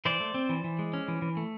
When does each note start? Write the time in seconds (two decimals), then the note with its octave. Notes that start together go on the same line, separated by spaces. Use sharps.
0.05 E3 C5 D5
0.20 A3
0.34 C4
0.49 E3
0.64 E3
0.79 G#3
0.94 C#4
1.08 E3
1.22 E3
1.37 A3